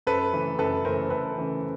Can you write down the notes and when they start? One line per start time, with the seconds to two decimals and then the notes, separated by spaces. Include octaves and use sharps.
0.07 F#2 A4 B4
0.33 C#3 E3 A3
0.59 F#2 A4 B4
0.85 C#3 E3 A3 A#4 C5
1.10 F#2 A4 B4
1.37 C#3 E3 A3